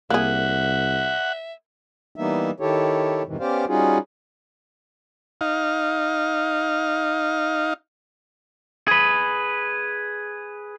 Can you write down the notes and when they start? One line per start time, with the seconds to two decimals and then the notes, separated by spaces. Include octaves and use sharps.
0.10 C2 A#3 G#4 E5 F#5
2.16 E3 G3 A#3 B3 D#4 E5
2.60 D#3 E4 G4 A4 C#5
3.26 F2 G#2 C3 D#3 E3
3.40 B3 C#4 G4 C5 D5 F5
3.68 G3 C#4 D#4 F4 F#4 G#4
5.41 D#4 F5
8.88 G#4 B4